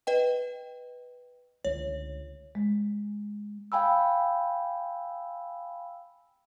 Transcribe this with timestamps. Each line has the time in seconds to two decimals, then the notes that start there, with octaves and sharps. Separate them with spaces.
0.07 B4 D#5 G5
1.64 C#2 D3 C#5
2.55 G#3
3.72 F5 G5 G#5 B5 E6